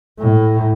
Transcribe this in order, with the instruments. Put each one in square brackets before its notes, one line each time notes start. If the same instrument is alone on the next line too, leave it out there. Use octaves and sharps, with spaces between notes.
[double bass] A2